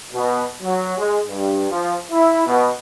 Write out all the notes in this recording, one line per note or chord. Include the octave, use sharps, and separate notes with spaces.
B2
F#3
G#3
G2
F3
E4
B2